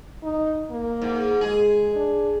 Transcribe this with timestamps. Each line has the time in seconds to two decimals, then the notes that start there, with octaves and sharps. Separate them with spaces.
0.23 D#4
0.71 A#3
1.02 G#2
1.41 G#3 G#4
1.95 D4